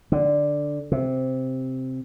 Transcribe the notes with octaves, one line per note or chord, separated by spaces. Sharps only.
D3
C3